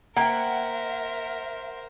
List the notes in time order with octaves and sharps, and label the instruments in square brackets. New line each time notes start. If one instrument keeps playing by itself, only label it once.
[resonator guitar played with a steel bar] A#3 G5 [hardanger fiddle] A#4 C5 [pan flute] E5 [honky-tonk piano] F#5